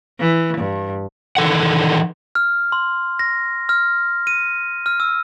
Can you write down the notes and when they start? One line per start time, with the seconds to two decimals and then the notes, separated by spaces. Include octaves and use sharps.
0.20 E3
0.58 G2
1.37 D#3 E3 A4 F#5
2.35 F6
2.72 C6
3.19 A#6
3.69 F6
4.27 D#7
4.86 F6
5.00 E6